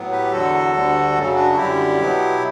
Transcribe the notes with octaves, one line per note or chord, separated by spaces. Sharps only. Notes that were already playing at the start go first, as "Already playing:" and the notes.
Already playing: A2 F#3 B3
G4 B4
E2 D3 F#3 F#4 A4
D2 D3 G3
F#2 C#3 F#3
D4 F#4
F#4
F#2 D3 G3 E4 G4
B2 F#3 B3